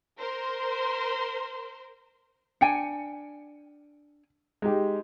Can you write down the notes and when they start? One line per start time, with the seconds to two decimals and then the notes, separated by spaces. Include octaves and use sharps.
0.18 A#4 C5 C6
2.61 D4 G5 G#5 C#7
4.62 G#3 D#4 G4